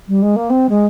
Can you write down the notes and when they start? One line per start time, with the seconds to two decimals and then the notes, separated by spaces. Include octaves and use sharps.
0.08 G3
0.22 G#3
0.36 A#3
0.50 C4
0.69 G#3